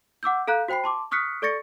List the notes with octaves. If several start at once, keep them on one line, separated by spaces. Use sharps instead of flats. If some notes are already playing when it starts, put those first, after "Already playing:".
F#5 D6 E6 G6
A4 F5 A#5 F#6 G6
F#4 C5 G5 B5 C7
A5 C6 D6
C#6 D#6 F6 F#6 B6 C#7
A4 D5 C#6 A6 A#6 C#7